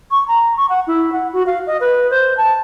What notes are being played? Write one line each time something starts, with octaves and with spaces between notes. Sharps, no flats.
C#6
A#5
C#6
F#5
E4
F#5
F#4
F5
D#5
B4
C5
A5